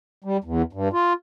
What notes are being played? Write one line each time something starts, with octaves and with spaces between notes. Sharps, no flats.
G3
E2
G2
F4